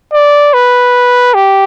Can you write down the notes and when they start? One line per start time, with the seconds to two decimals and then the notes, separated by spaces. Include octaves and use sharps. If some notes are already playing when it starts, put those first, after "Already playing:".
0.13 D5
0.54 B4
1.34 G4